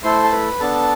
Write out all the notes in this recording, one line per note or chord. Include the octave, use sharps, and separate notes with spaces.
A3 E4 A4 C5 C6
A5
B4 B5
B3 D4 A4 A5